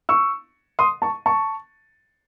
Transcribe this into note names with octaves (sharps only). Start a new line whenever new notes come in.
C#6 E6
C6 D#6
A5 C#6
A5 C#6